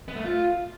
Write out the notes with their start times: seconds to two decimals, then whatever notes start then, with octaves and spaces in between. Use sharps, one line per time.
0.08 B3
0.16 A3
0.24 F4